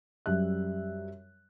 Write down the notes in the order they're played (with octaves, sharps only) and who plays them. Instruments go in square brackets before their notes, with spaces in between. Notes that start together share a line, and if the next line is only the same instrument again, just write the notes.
[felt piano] F#2 G3 E5 F#6